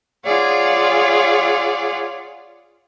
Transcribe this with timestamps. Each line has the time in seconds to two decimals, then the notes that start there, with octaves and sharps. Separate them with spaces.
0.24 F4 G#4 C#5 D5 F#5